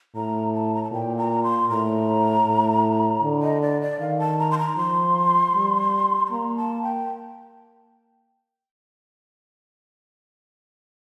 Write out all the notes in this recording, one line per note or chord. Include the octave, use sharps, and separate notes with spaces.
A2 A#5
A5
A#5
A5
A#2 G5
A#5
C6
A2 A#5
A2
D3
D#5
D5
D5
D#3 F5
A5
A#5
C6
A#5
F3 C6
G3
C6
A#3 A#5
A5
G5